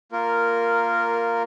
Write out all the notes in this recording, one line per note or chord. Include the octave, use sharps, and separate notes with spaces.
A#3 F4 A#4